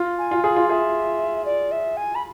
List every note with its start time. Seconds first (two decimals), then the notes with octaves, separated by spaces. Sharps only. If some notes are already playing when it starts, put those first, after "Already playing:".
Already playing: F4
0.19 G#5
0.31 F4
0.43 G#4 F5
0.56 F4
0.69 G#4 E5
1.45 D5
1.72 E5
1.97 G#5
2.15 B5